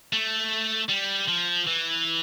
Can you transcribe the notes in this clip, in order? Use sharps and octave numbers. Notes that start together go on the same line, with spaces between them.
A3
G3
F3
E3